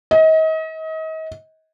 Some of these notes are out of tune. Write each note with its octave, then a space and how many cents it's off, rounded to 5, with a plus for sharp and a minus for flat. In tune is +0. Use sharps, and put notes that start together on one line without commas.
D#5 +35